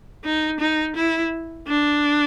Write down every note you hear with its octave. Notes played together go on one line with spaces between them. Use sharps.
D#4
D#4
E4
D4